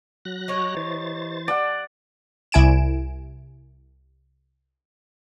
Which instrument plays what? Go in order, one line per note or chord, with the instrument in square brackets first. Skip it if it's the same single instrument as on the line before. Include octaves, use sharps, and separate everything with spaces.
[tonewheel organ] F#3 F#6 A#6
[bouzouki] D#4 G4 C#5
[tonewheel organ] E3 C5 A6
[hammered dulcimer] D5 F#5 [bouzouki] G5 A5
[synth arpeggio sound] C2 E4 G#5 D7 E7